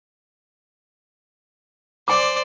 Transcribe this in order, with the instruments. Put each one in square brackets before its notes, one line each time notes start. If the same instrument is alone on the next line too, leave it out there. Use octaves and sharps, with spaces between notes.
[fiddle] C5 D5 [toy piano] G#5 D6